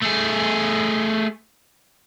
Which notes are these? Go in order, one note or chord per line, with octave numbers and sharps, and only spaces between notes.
A3 G#4